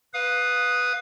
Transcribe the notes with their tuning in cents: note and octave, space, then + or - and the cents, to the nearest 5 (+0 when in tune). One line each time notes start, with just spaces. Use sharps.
B4 +0 F5 +20 D#6 +0